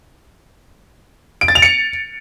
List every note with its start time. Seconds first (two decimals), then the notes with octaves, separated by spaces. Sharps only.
1.41 D7
1.48 A6
1.55 F7
1.62 C#7